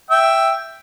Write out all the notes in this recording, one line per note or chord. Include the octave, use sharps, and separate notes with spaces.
E5 G5